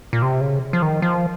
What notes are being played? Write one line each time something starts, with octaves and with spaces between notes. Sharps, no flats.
A#2
C3
C#3
F3
D#3
F3